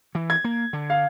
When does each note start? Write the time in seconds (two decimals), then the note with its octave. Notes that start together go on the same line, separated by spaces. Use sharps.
0.15 E3
0.30 G#6
0.44 A#3
0.73 D3
0.90 F5